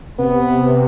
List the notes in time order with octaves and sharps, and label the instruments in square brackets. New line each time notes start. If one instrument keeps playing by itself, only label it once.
[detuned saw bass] C3 [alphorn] B3